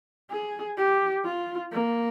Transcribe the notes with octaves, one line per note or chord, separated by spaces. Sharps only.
G#4
G4
F4
A#3